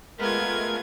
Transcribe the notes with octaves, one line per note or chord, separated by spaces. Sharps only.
G#3 A3 B3 F4 A#4 G#6